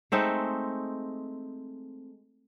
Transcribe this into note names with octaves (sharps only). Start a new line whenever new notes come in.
G#3 A3 C4 D#4